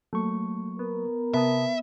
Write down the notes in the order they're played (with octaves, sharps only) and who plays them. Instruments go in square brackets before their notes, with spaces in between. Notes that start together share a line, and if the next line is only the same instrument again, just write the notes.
[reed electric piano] F#3 A#3 C#6 [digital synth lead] A3
[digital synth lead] B3 [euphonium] A#4
[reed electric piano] C3 A5 D#6 [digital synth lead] B3 [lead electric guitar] E5